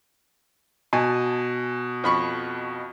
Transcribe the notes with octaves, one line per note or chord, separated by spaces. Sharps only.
B2 G#5 A5
F2 B5 C#6